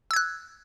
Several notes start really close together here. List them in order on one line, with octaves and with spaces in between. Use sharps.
E6 G#6 F#6